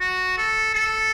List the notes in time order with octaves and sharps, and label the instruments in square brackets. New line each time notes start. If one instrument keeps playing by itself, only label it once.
[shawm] F#4
A4
A4